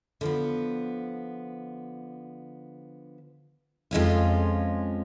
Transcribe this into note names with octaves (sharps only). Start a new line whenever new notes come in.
D3 F3 B3
F2 F3 G#3 C#4 F4